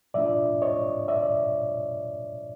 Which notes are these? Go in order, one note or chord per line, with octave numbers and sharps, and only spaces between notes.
A2 F3 A3 D4 F4 D5 E5
C#5 D#5
D5 E5